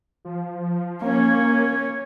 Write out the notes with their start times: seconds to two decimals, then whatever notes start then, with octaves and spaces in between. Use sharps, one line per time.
0.25 F3
1.02 A#3 C#4 C#5